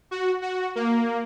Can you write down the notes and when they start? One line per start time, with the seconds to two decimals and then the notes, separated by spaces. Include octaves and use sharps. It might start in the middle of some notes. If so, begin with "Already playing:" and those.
0.11 F#4
0.42 F#4
0.76 A#3